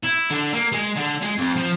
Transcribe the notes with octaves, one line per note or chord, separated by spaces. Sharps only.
E4
D3
A#3
G#3
D3
G#3
F2
F3